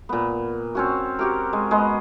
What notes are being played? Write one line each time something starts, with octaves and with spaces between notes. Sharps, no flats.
A#2 B3
C4 C#4 F#4
F#4 G4 A#4
G#3
G#3 B3 D#5